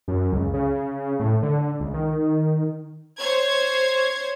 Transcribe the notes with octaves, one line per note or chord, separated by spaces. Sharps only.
F#2
C#2
C#3
A2
D3
C#2
D#3
C5 C#5 G#6